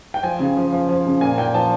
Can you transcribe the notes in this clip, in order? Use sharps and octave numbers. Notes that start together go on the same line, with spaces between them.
G5
F3 G#5
C#3
F3
F3
F3
C#3
A#2 G#5
A#2 G5
F3 A5